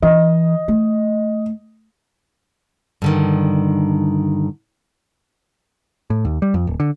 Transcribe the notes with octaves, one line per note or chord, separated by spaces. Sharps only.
E3 D#5
A3
G2 D3 D#3
A2
D#2
G3
F2
D1
D3